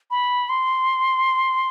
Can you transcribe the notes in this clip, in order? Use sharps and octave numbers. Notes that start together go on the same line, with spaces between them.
B5
C6